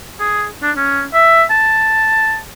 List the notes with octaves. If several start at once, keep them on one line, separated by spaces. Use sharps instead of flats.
G#4
D4
C#4
E5
A5